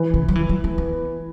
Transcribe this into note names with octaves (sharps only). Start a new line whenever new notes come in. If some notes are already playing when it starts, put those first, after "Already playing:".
Already playing: E3
C#3
F#3
E3
F#3
A3
B3